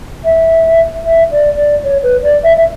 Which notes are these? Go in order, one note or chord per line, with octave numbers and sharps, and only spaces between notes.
E5
E5
D5
D5
C#5
B4
D5
E5
E5